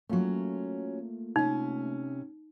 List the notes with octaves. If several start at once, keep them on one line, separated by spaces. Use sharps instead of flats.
F#3 A3 A#3 C#4 F4
C3 C#4 D#4